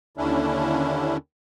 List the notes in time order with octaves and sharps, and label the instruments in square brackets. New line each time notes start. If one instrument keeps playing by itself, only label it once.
[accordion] D#2 D3 C#4 D4 E4